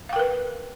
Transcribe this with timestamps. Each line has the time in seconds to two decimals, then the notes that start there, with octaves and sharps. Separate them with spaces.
0.09 F5
0.13 G5
0.16 A#4
0.19 B4